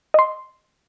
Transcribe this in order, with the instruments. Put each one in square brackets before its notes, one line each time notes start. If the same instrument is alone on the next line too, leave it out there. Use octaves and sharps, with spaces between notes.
[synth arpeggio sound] D#5 C6